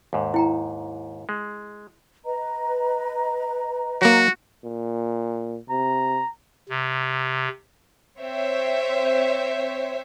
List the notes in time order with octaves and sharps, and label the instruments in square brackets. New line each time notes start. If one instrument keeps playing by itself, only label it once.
[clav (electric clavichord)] D#2 G#2
[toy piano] E4 G5 A#5
[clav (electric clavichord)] G#3
[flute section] B4 D#5 A#5
[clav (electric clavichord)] F#3 A#3 [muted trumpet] F#4
[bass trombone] A#2
[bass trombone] C3 [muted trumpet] A#5
[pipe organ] C3
[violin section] C4 C5 C#5 E5